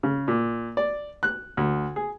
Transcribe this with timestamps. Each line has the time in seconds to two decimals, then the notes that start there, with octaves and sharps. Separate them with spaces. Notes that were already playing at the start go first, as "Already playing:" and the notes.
0.03 C#3
0.28 A#2
0.77 D5
1.23 F#6
1.57 D2
1.96 G#4